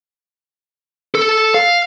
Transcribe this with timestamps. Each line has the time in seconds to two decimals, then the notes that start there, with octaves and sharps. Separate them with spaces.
1.15 A4
1.54 F5